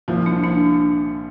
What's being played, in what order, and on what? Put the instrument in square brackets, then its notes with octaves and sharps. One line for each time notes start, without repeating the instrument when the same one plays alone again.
[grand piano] C2 A#2 F3
[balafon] D4
D4